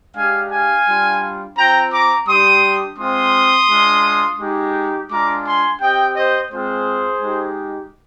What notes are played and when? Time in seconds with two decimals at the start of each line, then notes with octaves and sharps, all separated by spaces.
0.16 G#3 D4 G4 F5 G#5
0.52 F5 G#5
0.87 G3 D4 F4
1.58 C4 F4 G5 A#5
1.93 A#5 D6
2.28 G3 D4 G4 C6 D#6
2.99 G#3 C4 F4 C6 D#6
3.69 G#3 D4 F4
4.40 G#3 D#4 G4
5.11 G#3 D4 F4 A#5 D6
5.46 G#5 C6
5.81 C4 G4 D#5 G5
6.16 C5 D#5
6.51 G#3 C4 F4 G#4 C5
7.22 G#3 D#4 G4